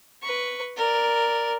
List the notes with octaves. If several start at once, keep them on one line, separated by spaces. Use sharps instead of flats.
B4 C#6
A#4 D5